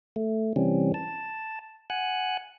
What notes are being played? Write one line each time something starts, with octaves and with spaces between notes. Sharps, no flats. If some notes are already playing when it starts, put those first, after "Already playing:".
A3
C3 E3 G3 C4 C#4
A5
F#5 G#5 F#6